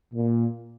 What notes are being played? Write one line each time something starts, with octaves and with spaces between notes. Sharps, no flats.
A#2